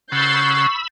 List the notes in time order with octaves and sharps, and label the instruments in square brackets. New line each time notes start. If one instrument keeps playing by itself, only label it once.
[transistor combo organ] C#3 F#5 [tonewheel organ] B5 E6 [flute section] C#6 [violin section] G6 A6 C7